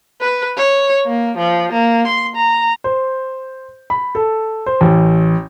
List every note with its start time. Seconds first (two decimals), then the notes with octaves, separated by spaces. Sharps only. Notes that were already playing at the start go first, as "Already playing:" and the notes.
0.21 B4
0.57 C#5
1.06 A#3
1.37 F3
1.72 A#3
2.07 C6
2.35 A#5
2.84 C5
3.90 B5
4.15 A4
4.66 C5
4.81 A1